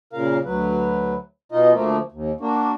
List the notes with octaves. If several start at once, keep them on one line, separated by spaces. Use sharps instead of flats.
A#2 C#3 A#4 F5
D2 F#3 B4
B2 D#4 F4 D#5
D2 F3 A3 A#3
D#2
A#3 D4 F#4